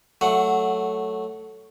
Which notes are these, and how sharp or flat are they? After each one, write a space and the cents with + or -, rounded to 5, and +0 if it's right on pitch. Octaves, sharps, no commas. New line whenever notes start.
F#3 +10 A3 +0 F#5 -5